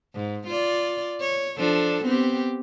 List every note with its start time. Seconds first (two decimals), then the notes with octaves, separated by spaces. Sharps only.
0.15 G#2
0.47 F4 D5
1.21 C#5
1.57 F3 D4 A4
2.04 B3 C4 G4